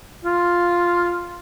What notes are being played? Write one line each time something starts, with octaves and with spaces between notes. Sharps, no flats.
F4